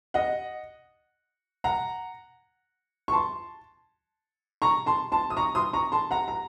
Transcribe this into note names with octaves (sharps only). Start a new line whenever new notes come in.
D#5 F#5
F#5 A#5
C#6
A5 C6
A#5 C#6
A5 C6
A5 C6
D#6
A#5 C#6
C6 D#6
A#5 C#6
A5 C6
F#5 A#5
A#5